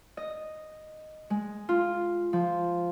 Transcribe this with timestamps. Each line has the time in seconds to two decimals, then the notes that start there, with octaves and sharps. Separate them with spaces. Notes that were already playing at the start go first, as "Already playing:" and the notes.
0.17 D#5
1.30 G#3
1.69 F4
2.33 F3